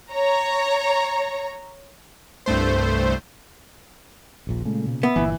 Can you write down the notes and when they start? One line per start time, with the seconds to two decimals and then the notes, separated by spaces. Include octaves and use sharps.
0.12 C#5 A#5
2.46 C2 G2 A3 C5
4.47 D#1 A#1 A#2
4.65 A#2 C#3 G#3 A3
4.87 B2
5.03 B3 E5
5.16 G1 A#2 E3